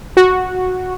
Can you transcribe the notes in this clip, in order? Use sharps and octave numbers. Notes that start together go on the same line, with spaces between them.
F#4